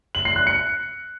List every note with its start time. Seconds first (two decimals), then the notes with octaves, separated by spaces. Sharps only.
0.15 F#7
0.25 C7
0.36 F#6
0.47 C#7